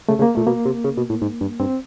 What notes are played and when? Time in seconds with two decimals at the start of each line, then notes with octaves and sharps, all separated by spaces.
0.09 C#3 A3
0.19 C#3
0.22 A#3
0.35 A#2 A3
0.47 B2 A#3
0.65 C3
0.84 C#3
0.97 B2
1.10 A2
1.22 G#2
1.41 G2
1.60 G2 C4